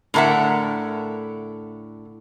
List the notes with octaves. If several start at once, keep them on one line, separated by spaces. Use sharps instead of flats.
A2 D3 A#4 E5 F#5